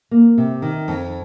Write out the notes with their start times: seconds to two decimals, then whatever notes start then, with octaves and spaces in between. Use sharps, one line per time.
0.11 A#3
0.38 C3
0.62 D#3
0.88 F2